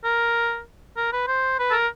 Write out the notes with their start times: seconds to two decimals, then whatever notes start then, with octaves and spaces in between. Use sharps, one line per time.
0.04 A#4
0.97 A#4
1.13 B4
1.27 C5
1.59 B4
1.71 A4
1.73 A#4